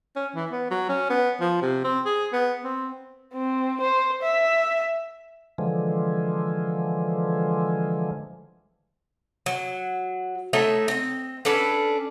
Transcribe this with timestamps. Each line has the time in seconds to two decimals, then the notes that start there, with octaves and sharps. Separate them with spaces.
0.16 C#4
0.35 E3
0.51 B3
0.71 F#3
0.89 C#4
1.10 B3
1.41 F3
1.62 C3
1.85 C4
2.06 G#4
2.33 B3
2.64 C4
3.34 C4
3.81 C5
4.23 E5
5.58 D3 E3 F3 G#3
9.46 F#3
10.53 A3 D#4 C#5 E5
10.88 C4 D#5
11.45 C#4 D4 A4 B4